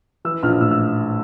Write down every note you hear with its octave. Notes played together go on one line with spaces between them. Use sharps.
E3 E6
A#1 F6
A2 E6
E6